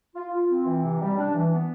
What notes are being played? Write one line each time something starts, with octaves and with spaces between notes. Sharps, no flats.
F4
F4
C4
E3
C3
G3
D4
E3
B3